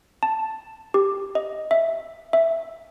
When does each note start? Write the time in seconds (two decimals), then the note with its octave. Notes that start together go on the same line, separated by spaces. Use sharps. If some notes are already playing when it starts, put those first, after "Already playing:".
0.23 A5
0.94 G4
1.35 D#5
1.71 E5
2.33 E5